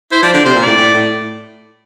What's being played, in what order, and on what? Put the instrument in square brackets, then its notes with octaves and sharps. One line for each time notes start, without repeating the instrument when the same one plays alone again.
[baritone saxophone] E4 [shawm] C5
[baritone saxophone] F3 [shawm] D5
[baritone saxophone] D3 [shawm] D5
[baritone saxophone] C3 [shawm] C5
[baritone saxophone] A#2
[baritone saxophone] A2 [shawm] D5
[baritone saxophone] A2
A2